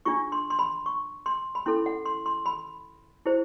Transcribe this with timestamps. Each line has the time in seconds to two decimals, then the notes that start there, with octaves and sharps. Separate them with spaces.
0.05 D4 F4 G#4 C#6
0.32 C6
0.50 C6
0.59 B5
0.86 C#6
1.26 C6
1.55 B5
1.66 C#4 E4 A4 C6
1.86 F#5
2.06 C6
2.26 C6
2.46 B5
3.26 E4 G#4 C5